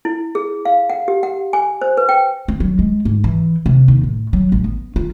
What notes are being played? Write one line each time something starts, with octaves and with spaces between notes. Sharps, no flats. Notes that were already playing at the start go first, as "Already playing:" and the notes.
E4
G#4
F5
F#5
G4
F#5
G#5
C5
B4
G5
C4
F#3
G#3
G#2
E3
C3
D#2
A2
F#3
A1
B3
F4